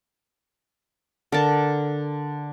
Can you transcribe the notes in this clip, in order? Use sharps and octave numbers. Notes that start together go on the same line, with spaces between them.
D3 A#4 A5